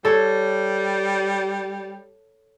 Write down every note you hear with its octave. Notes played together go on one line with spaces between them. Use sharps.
G3 A4 C#5